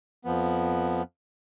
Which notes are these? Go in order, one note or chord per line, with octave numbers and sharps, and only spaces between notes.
F2 F3 B3